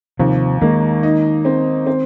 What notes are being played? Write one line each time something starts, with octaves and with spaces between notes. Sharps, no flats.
D#2 C3 F3
D#3 G#3 A#3
D#4
C4
C4